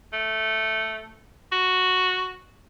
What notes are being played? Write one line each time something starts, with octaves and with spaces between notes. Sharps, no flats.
A3
F#4